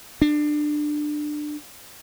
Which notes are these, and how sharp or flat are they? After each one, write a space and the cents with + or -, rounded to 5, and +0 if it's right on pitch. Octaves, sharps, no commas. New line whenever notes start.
D4 +20